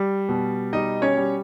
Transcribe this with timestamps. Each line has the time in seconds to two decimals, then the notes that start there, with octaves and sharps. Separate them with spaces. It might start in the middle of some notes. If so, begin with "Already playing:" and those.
Already playing: G3
0.29 B2
0.73 G3 D#4 D#5
1.02 C#4 C#5
1.17 G3